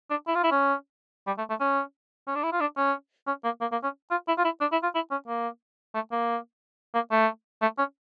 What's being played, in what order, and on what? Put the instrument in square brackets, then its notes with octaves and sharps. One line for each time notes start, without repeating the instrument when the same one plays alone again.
[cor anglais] D4
E4
F4
E4
C#4
G3
A3
A3
C#4
C#4
D4
E4
F4
D4
C#4
C#4
A#3
A#3
A#3
C#4
F4
E4
F4
E4
D4
E4
F4
E4
C#4
A#3
A3
A#3
A#3
A3
A3
C#4